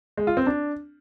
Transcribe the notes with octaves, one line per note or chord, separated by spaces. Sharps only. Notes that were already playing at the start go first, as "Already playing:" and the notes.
G#3
F4
C4
D4